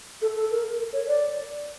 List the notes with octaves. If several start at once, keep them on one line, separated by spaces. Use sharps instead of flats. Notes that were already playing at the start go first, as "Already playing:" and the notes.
A4
A4
A#4
A#4
C#5
D5